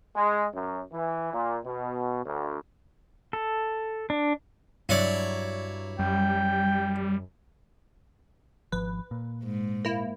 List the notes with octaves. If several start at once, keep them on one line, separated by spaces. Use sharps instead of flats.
G#3
F#2
E3
A#2
B2
D2
A4
D4
G2 F#3 E4 C#5 D5
F#2 G3 G5
G#1 F3 B4
A#2
G#2
A#3 E4